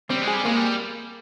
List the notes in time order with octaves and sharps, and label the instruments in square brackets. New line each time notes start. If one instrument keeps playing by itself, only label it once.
[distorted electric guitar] G3 [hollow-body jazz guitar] C4
[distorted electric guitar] G#3
[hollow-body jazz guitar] G#4
[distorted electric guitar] G3
[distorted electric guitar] G#3 [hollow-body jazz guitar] A#3
[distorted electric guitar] G3